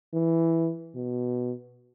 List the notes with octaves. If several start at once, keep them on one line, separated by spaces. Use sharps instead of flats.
E3
B2